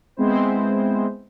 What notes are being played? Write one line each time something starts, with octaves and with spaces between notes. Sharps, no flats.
G#3 B3 C4 E4 C5